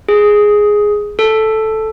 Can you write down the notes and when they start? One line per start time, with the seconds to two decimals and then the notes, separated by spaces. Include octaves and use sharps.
0.08 G#4
1.19 A4